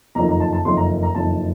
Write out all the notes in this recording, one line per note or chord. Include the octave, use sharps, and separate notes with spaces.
F#1 F2 D#3 A#5
A#5
A5
A5
F#1 F2 D#3 C6
A#5
A#5
F#1 F2 D#3 A5